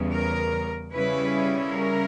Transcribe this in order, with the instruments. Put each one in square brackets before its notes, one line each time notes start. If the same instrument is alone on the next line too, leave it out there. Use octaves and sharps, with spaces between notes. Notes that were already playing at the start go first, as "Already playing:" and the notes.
Already playing: [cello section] E2 C#3 G3 B3
A#4
C#3 G3 C#4 E4 B4
A#4